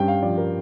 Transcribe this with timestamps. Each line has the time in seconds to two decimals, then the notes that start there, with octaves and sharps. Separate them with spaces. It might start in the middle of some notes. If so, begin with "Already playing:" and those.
Already playing: G2 C#4 G5
0.08 F5
0.23 F3 D5
0.38 A#4